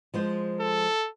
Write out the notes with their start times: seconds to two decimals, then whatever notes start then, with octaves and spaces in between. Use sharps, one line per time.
0.14 F3 G#3 C5
0.60 A4